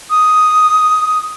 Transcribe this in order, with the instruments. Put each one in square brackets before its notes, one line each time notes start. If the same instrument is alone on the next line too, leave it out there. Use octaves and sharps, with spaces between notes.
[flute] D#6